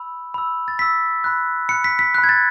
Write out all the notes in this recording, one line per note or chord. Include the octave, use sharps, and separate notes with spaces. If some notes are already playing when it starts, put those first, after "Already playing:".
Already playing: B5 E6
B5 E6
A6
B5 E6 B6
B5 F#6
B5 F#6 C#7
B6
B6
B5 F#6
G#6
A6